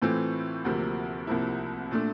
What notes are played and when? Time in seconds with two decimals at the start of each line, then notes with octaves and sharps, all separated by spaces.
0.02 A2 E3 A3 C4 F4
0.65 D2 C3 F3 A#3
1.27 C2 C3 F3 A#3 E4
1.91 A#2 A3 D4